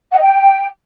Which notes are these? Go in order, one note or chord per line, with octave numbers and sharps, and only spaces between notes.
F#5
D#5
G5